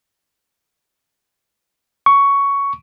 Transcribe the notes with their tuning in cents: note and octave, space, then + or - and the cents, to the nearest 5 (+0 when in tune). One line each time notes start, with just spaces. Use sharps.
C#6 +10